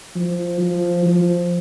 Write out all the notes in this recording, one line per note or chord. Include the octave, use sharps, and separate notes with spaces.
F3
F3
F3